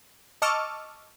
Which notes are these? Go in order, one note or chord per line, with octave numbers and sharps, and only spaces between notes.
D#5 A5 C#6 D6 E6 F6